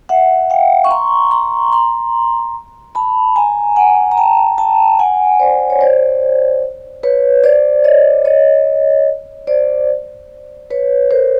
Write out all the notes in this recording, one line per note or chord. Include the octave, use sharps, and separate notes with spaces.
E5 F#5
F5 G5
C#6
A#5 C6
A#5 C6
A#5 C6
A5 B5
G#5 A#5
F#5 G#5
A#5
G5 A5
G5 A5
F#5 G#5
C5 D5
C#5
C5 D5
B4 C#5
C5 D5
C#5 D#5
C#5 D#5
C5 D5
B4 C#5
A#4 C5